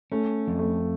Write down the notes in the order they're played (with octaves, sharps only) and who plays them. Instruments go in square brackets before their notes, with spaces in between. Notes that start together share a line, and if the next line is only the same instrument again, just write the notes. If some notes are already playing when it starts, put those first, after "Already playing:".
[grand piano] A3 [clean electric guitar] C#4
[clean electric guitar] F2
[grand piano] A3